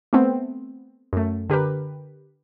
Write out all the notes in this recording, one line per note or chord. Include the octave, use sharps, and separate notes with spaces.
A3 B3 C4
F#2 A3
D3 G4 A#4 B4